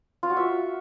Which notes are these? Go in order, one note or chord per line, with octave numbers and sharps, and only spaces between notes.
F4
F#4
E5